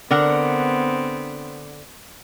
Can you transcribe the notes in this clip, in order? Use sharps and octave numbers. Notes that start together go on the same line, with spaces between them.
D3 B3 C4 A#4 F#5